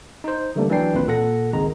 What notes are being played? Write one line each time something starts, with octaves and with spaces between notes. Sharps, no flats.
D#4 C5
D3 E3 G3 A3 A#3 D4
E3 F#3 D4 D5 G5 C7
G#1 C#2 A#3 C4 F4 B4
A#2 A4 F#5 A#6
G#1 C#2 D#3 G#3 C4 A#5